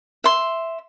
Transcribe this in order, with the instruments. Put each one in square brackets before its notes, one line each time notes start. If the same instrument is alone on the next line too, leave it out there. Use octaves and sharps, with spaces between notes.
[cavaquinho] E5 C6